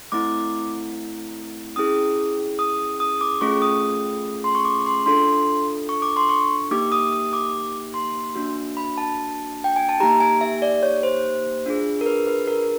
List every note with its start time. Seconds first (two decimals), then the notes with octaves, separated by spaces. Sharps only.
0.12 A3 C4 E4 D6
1.76 C#4 E4 G#4 D#6
2.59 D#6
3.00 D#6
3.21 D6
3.41 A3 C#4 F4 G#4 C#6
3.62 D#6
4.44 C6
4.55 C#6
4.65 D6
4.86 C6
5.06 D4 F4 A4 C6
5.89 C#6
6.02 D6
6.17 C6
6.29 C#6
6.71 A#3 D#4 G4 D6
6.92 D#6
7.13 D#6
7.33 D6
7.94 C6
8.35 A#3 D4 F#4
8.77 B5
8.98 A5
9.64 G5
9.76 G#5
9.89 A5
10.00 A#3 D#4 G4 A#5
10.20 G#5
10.41 E5
10.62 D5
10.83 C#5
11.03 C5
11.66 D4 F4 G#4
12.01 A#4
12.06 B4
12.27 B4
12.47 A#4